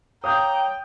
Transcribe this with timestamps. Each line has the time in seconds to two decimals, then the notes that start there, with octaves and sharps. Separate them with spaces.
0.24 C#5 F5 G5 A#5 D6 D#6 G6